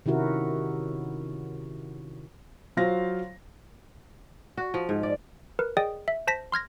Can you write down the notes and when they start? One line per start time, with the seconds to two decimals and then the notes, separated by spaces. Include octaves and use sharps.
0.06 C3 D#3 C#4 E4 F#4 A#4
2.77 F#3 F4 C5 F5 A#6
4.57 F#4
4.74 F3
4.89 G#2
5.03 D5
5.59 A#4 B4
5.77 G#4 D5 D#5 G5 D#6
6.08 E5
6.27 C5 A5 A#6 B6
6.52 C6 F6 G#6 A#6